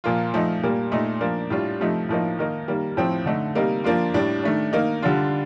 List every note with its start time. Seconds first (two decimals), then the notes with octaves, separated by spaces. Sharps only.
0.04 A#2 F3 A#3 F4
0.34 F3 A3 D#4
0.63 A#2 G3 A#3
0.92 A#2 A3 D#4
1.21 F3 A#3 D4
1.50 A2 G3 D4 F4
1.80 C3 F3 A3 D#4
2.09 A2 F3 A#3 D#4
2.39 D#3 A#3 D#4
2.68 D#3 G3 A#3
2.97 A2 F3 C4
3.26 D3 A3 D#4
3.55 C3 G3 A#3 D#4
3.84 F3 A#3 D4 F4
4.14 A2 G3 D4
4.43 D#3 A3 D4
4.73 D#3 A#3 D#4
5.02 D3 G3 D4 F4